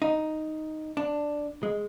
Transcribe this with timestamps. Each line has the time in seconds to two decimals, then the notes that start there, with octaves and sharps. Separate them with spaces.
0.02 D#4
0.97 D4
1.63 G#3